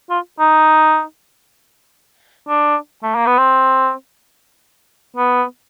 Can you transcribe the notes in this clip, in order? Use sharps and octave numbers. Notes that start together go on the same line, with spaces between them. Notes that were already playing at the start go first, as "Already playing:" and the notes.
F4
D#4
D4
A3
A#3
B3
C4
B3